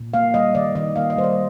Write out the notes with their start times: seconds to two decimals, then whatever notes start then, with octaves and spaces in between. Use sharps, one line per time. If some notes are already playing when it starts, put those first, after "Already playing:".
Already playing: A#2
0.14 A#3 F5
0.34 G3 D#5
0.55 D#3 D5
0.75 D#3 D#5
0.96 A#3 F5
1.10 D#5
1.17 G3 C5
1.24 D5